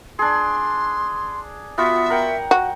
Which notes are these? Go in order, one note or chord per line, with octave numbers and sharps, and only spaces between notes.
D4 G#4 C6
B3 F4 F#4 E5
A#4 F#5 G5
F#4